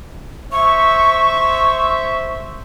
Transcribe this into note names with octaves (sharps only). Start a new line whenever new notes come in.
C5 E5 C#6